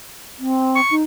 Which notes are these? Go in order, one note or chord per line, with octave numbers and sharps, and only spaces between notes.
C4
C#6
D#4